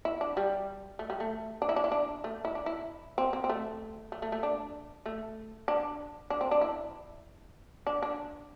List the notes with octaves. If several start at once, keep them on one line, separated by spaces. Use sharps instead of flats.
E4
D4
G3
A3
G3
A3
D4
E4
D4
E4
D4
A3
E4
D4
E4
C4
C4
C4
A3
A3
A3
A3
D4
A3
D4
D4
C4
D4
E4
D4
D4